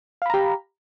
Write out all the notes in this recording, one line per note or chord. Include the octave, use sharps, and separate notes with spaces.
G4 F5 A#5 B5